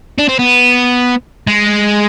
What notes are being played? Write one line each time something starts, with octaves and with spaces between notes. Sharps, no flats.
D4
C4
B3
G#3